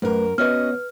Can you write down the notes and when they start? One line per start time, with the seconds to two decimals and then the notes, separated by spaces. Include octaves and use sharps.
0.02 F#2 A3 A#4 B4
0.38 B3 C#4 F#4 B4 C#5 D#5 F6